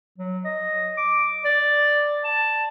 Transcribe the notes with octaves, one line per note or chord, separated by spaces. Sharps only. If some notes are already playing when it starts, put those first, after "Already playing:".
F#3
D#5
D6
D5
A5